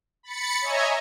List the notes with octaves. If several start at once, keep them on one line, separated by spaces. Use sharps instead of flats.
B5 A6 C#7
C#5 D#5 E5 G#5 A#5